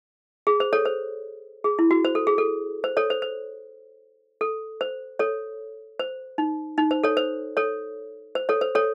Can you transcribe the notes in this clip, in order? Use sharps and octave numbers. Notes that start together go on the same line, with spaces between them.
G#4
C5
A4 C#5
C5
G#4
E4
F#4
C5
A4
G#4
A4
C5
A4 C#5
C5
C5
A4
C5
A4 C#5
C5
D#4
D#4
C5
A4 C#5
C5
A4 C#5
C5
A4 C#5
C5
A4 C#5